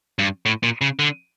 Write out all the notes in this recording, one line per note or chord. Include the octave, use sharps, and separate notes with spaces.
G2
A2
A#2
C#3
D3